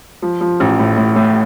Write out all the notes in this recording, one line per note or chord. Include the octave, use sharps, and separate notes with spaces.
F3
F3
A1
A2
A2
A2